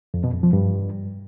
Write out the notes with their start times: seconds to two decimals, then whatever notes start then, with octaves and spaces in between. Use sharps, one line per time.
0.14 F2
0.24 B2
0.33 F2
0.43 F3
0.53 G2